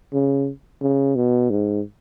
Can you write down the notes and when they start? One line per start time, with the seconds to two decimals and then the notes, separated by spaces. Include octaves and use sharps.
0.13 C#3
0.82 C#3
1.15 B2
1.50 G#2